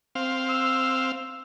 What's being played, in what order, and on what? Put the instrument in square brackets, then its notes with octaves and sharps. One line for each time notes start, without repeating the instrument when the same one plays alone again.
[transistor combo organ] C4 F5
[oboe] E6